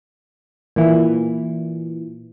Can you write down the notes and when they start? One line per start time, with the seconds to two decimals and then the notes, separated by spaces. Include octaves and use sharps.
0.76 A#2 E3